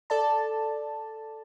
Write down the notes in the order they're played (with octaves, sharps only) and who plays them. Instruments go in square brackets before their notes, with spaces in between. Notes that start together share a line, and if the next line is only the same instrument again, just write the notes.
[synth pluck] A4 D5 A5